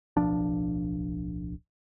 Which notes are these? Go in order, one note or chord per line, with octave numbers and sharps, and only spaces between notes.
D1 B1 F3 D4